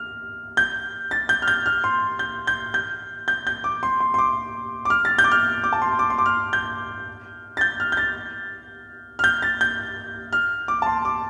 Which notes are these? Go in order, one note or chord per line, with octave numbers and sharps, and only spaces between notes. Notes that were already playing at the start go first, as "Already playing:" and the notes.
Already playing: F6
G6
A6
G6
F6
G6
F6
C6
G6
G6
G6
G6
G6
D6
C6
C6
C6
D6
D6
F6
A6
G6
D6
F6
D6
A5
C6
D6
C6
D6
F6
G6
A6
G6
F6
G6
A6
F6
G6
A6
G6
F6
D6
A5
C6
D6